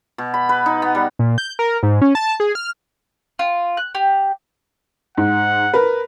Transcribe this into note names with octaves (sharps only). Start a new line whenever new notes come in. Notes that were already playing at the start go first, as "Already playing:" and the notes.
B2
B5
B4
D#4
B3
G3
A#2
G6
A#4
G#2
C#4
A5
G#4
F6
F4
F#6
G4
G#2 F#5
A#4 B4